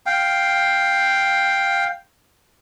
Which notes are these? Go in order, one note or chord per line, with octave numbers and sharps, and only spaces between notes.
F5 G5